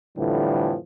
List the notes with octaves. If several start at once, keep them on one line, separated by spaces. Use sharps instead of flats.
F2 A2 D3 E3 F3 G3